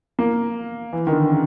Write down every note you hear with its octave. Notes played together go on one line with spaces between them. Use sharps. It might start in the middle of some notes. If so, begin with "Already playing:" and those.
A#3
E3
D#3
D3
C#3